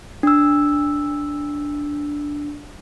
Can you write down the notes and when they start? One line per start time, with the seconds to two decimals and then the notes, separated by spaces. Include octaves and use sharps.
0.23 D4 E6